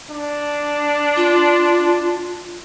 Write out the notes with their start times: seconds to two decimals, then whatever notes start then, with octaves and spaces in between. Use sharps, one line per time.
0.11 D4
1.16 F4